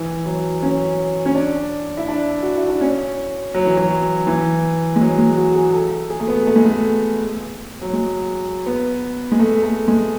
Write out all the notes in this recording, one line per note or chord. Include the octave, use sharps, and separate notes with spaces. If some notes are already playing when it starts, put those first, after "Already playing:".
Already playing: E3
F#3
C#4
C#4
D4
E4
D4
F#4
E4
D4
C#4
F#3
E3
F#3
E3
G#3
F#3
G#3
F#4
G#4
A4
G#4
A3
B3
A3
G#3
A3
F#3
G#3
B3
G#3
A3
A3
G#3